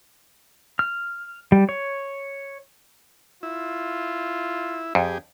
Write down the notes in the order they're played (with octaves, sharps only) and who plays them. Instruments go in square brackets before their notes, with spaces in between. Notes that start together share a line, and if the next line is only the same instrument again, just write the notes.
[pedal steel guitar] F6
G3
C#5
[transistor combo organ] E4 [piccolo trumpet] F4
[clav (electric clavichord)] F2 [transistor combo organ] G4 G#4